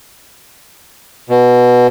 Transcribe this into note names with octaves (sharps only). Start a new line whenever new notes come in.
B2